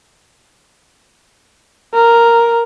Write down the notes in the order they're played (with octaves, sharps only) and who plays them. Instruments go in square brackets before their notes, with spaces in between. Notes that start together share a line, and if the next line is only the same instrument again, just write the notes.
[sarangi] A#4